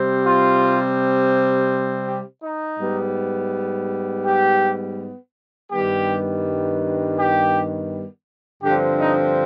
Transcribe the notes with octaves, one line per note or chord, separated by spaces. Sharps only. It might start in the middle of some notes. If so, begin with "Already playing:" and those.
Already playing: C3 G3 C4
F4
G4
D#4
G#2 G3 B3
G4
G2 D#3 G3 B3 G4
G4
G2 D3 F3 C4 G4
D#4